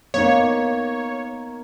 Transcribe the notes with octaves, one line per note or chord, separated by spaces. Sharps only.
A#3 B3 D#4 C#5